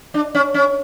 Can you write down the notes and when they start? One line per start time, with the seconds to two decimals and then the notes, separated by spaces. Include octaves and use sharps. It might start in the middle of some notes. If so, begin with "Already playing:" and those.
0.14 D4
0.35 C#4
0.54 C#4